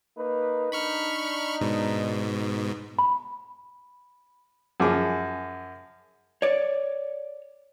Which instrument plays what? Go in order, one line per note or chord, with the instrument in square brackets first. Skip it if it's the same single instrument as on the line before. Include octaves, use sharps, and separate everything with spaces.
[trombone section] A#3 D#4 B4
[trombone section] D4 D#4 [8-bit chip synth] B5 C#6 F6
[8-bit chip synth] G#2 B2
[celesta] B5
[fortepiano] F#2 F3 G#4 D6
[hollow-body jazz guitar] C#5 D5